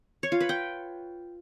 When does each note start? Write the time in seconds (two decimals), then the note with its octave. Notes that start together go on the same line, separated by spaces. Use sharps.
0.23 C#5
0.32 F4
0.40 B4
0.49 G5